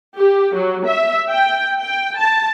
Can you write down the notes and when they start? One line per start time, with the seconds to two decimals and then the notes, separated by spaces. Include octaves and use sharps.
0.17 G4
0.55 F#3
0.86 E5
1.30 G5
1.81 G5
2.17 A5